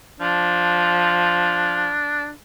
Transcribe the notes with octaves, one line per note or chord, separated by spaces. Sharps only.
F3 D4